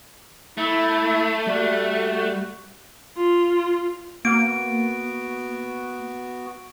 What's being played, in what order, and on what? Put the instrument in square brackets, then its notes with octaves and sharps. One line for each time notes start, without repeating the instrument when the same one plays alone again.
[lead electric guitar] A3 [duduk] E4
[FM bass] G3 [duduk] F#4
[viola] F4
[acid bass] A#3 [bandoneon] B3 F#4 [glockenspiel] D7